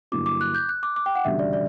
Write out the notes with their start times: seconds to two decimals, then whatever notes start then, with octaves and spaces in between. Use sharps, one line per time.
0.12 G2 D3 F#3 A#3 E4 D6
0.26 D6
0.41 F#6
0.55 G6
0.69 F#6
0.83 D6
0.96 D6
1.06 G5
1.15 F#5
1.25 E1 D2 C#3 G3 E5
1.39 D5
1.53 D5